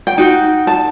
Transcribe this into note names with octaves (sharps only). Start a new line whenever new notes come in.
G5
D#4 F#4
A5